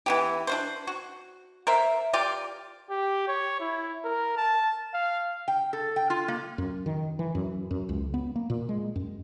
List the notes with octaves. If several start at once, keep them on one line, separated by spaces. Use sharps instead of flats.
E3 B3 G4
D4 F#4 C5
F#4
A#4 C5 E5
F4 G4 D5
G4
C#5
E4
A#4
A5
F5
G5
A4
G5
F4
A#3
F#2
D#3
E3
F#2
F#2
C#2
B3
A#3
A#2
G#3
F#2